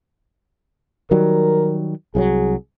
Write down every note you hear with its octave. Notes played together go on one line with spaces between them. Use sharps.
D#3 F#3 G3 A#4
C2 F3 F#3 G#4